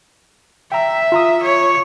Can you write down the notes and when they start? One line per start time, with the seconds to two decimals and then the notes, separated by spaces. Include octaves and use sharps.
0.72 E5 G5 A#5
1.12 F4 A#5 D#6
1.43 C#5